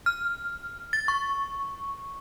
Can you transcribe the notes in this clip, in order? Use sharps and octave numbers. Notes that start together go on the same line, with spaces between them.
F6
A6
C#6